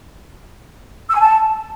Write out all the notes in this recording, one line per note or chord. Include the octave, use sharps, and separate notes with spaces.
E6
G#5
A5